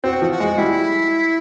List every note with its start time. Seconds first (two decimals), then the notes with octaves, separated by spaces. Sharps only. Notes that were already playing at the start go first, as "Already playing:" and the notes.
0.04 C4 F#4
0.22 F3
0.32 F#4
0.40 G#3
0.58 G3 E4